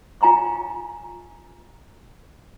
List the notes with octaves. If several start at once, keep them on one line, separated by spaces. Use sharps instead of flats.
F4 G#5 A#5 C6 C#6